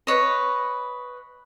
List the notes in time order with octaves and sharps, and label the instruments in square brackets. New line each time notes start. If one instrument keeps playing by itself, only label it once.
[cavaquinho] B4 C#5 D#5